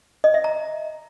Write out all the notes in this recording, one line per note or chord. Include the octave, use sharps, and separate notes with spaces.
D#5
E5
A#5